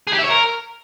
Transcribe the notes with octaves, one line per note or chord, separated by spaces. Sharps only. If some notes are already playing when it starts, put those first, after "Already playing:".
G#4
G4
E5
C#5
A#4